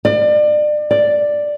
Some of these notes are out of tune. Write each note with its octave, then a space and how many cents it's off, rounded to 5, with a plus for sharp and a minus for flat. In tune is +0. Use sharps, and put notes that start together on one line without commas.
D5 +35
D5 +5